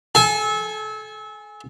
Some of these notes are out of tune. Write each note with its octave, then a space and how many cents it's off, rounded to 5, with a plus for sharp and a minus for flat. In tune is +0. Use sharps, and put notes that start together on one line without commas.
A4 -30 G#5 +0